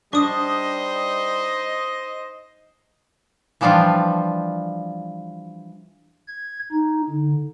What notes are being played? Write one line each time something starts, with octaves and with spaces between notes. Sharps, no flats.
G3 D4 D#4 C5 D#5 C#6 D#6
E3 F3 G3 D4 F4
G#6
D#4
D3